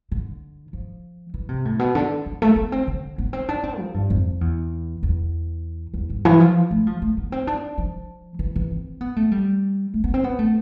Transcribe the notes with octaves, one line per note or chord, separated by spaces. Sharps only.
D3
F3
E3
C3
A2
B2
D3
F3
A3
B3
C4
D3
B3
C4
D4
C4
F3
G2
F2
E2
E2
E2
G2
E3
F3
A3
F3
A3
B3
C4
D4
F3
E3
E3
C4
B3
A3
G3
A3
B3
C4
B3
A3